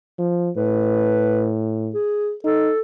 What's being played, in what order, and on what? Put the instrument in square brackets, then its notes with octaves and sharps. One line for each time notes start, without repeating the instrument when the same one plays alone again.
[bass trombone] F3
[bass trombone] A2 [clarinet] B4
[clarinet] G#4
[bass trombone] D#4 [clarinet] A4